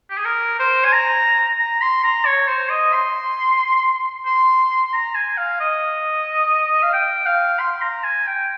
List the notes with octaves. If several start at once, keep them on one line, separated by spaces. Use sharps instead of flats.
G4
G#4
A#4
C5
G#5
A#5
A#5
C6
A#5
C#5
C5
D#5
C6
C6
A#5
G#5
F5
D#5
F5
G5
F5
C6
A#5
G#5
G5